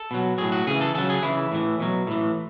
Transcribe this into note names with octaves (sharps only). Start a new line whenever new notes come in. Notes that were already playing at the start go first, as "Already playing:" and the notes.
Already playing: A4
B2 F#3
A2 F#3 G#4
F#4
C#3 E3 G#4
A4
C#3 F#3 A4
G#4
C#3 E3 E4
A2 E3
B2 F#3
A2 E3